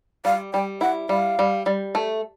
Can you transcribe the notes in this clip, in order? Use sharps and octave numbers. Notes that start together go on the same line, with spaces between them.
G3 F5
G3 G5
E4 F#5
G3 F5
G3
G3
A3